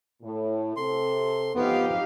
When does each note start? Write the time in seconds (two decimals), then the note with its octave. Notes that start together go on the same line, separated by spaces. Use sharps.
0.23 A2
0.77 C3 A4 C6
1.55 F2 F3 B3 D#4 G4 F5